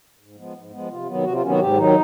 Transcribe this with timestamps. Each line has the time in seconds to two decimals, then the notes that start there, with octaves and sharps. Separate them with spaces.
0.18 G#2
0.36 F3 G#3 B3
0.54 G#2
0.71 F3 G#3 B3
0.89 C3 F4
1.07 D#3 F#3 B3
1.24 C3 F#4
1.33 F4
1.42 D#3 F#3 B3 C#4
1.51 F#4
1.59 G#2 G4
1.77 D#3 F#3 D#4